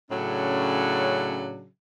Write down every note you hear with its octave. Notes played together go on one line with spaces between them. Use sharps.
A2 C#3 F#3 C#4 D4